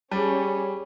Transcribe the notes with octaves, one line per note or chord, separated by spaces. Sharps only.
G3 C#4 G#4 A5